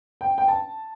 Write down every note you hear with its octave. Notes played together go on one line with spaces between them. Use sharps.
G5
G5
A5